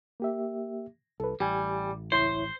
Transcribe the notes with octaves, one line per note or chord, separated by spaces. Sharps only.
A#3 G4 E5
C2 A4 B4
A1 G3 G4 G#5
C#2 E4 C5 C#5